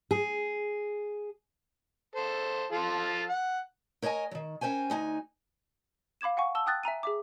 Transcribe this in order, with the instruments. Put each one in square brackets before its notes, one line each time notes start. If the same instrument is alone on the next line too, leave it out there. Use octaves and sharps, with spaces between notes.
[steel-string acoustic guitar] G#4
[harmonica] A4 C5
F3 F4 A4
F#5
[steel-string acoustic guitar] A#4 C#5 D#5 G5 G#5
D#3 F#3
C#4 A#4 C5 G5 G#5
D2 D#4 G#5
[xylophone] F5 B5 D6 G#6 E7
F5 F#5 G#5 C#6
A5 E6 G7
G5 D#6 F#6 A6
E5 G#5 A#5 D#7
G#4 E5 D6